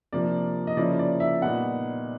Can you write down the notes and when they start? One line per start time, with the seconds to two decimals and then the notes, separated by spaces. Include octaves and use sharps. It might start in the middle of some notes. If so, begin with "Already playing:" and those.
0.13 C3 F3 A#3 D4 D5
0.67 D#5
0.77 C#3 F3 A#3 C#4 E4 D5
0.99 D5
1.20 E5
1.42 A#2 G3 B3 D#4 F#5